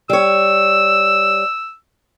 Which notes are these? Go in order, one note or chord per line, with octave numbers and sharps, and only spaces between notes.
G3 C#5 E6